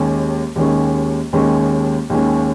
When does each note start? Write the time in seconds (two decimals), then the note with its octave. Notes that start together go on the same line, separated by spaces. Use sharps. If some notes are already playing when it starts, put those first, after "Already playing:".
Already playing: D#2 D#3 G#3 C#4
0.56 D#2 D#3 G#3 C#4
1.33 D#2 D#3 G#3 C#4
2.10 D#2 D#3 G#3 C#4